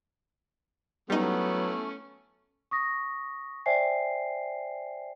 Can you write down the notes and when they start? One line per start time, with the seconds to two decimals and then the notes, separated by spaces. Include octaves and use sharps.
1.10 F#3 G3 A3 B3 C#4 D#4 E4
2.71 C#6 D#6 A#6
3.66 C5 D5 E5 G5 G#5 C7